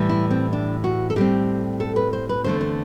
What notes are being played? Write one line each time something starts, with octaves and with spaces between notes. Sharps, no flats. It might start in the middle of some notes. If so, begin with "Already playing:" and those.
Already playing: A2 E3 G3
E4
C4
D4
F#4
A4
A2 G3 C4 G4
A4
B4
C5
B4
E2 D3 A3 C4 C5
C5